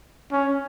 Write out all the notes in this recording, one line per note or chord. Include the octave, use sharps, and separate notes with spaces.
C#4